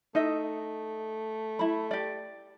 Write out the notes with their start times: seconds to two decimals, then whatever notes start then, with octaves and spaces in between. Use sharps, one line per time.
0.15 A3 D#4 D#5 E5
1.59 E4 B5
1.91 G4 D5